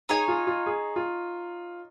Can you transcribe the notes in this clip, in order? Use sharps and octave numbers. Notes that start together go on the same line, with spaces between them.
D#4 G#4 C#5 G#5
F4
F4
G#4
F4